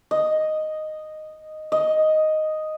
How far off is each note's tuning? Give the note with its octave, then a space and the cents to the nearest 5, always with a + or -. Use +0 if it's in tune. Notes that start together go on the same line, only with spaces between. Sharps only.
D#5 -5
D#5 +0